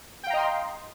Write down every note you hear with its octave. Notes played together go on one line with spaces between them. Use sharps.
D#5 F5 G5 A#5 C6